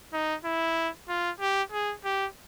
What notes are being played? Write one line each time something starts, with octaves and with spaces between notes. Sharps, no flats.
D#4
E4
F4
G4
G#4
G4